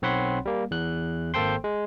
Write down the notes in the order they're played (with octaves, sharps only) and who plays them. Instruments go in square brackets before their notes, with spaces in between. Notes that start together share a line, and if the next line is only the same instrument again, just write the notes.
[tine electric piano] B1 C4 C#5 F#5 B5 C6
G3 A#3
E2 F#6
G#1 A#3 A4 C5 G5 C6
G#3